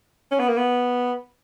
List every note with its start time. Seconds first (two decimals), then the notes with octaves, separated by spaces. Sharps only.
0.31 C#4
0.40 B3
0.48 A#3
0.57 B3